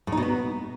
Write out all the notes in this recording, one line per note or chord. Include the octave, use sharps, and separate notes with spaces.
A2
D#4
B2
B3